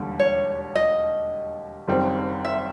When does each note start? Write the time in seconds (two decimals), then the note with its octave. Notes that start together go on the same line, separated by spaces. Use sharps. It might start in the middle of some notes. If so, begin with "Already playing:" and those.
Already playing: E1 D#2 D3 G3
0.19 C#5
0.75 D#5
1.88 F#1 F#2 D#3 G3 C4
2.45 E5